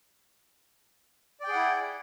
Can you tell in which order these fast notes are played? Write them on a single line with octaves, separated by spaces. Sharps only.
D5 G5 G#4 F#5 E4